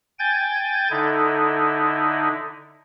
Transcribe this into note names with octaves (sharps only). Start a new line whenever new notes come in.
G5 G#5 G6 A6
D3 D#4 E4